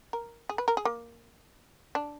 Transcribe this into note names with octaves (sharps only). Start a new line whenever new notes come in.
A#4
G#4
B4
A#4
G#4
A#3
D4